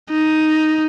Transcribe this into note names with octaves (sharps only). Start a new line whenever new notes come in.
D#4